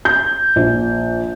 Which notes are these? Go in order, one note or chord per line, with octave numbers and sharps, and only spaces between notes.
G6
A#1